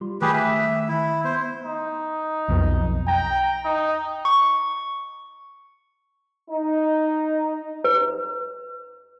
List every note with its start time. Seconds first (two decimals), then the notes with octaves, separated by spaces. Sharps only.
0.01 G3 F4 C6
0.22 D#3 A3 G4 G#4 B4
0.34 E5
0.89 E4
1.24 B3 C5
1.64 D#4
2.48 B1 F2 B2
3.08 G5 A#5
3.65 D#4
4.25 C#6
6.49 D#4
7.84 B4